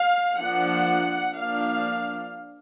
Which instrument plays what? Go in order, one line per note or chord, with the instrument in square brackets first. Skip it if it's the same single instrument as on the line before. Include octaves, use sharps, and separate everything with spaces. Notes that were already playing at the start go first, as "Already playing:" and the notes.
Already playing: [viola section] F5
F3 A#3 D4 F#5
F3 A#3 D4 F5